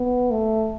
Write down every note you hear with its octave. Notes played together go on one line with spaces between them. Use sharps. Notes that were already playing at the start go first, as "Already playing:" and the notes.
Already playing: B3
A3